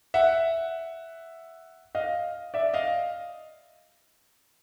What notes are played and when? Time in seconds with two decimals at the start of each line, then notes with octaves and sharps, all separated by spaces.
0.14 E5 F#5
1.95 D#5 F5
2.54 D5 E5
2.74 D#5 F5